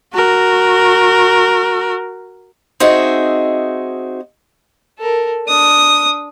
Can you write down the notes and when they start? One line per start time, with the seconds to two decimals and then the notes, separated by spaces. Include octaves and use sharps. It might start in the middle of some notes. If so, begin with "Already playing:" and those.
0.13 F#4 A#4
2.80 C4 D#4 F#4 G#4 D#5 E5
4.99 A4 A#4
5.47 D4 D#6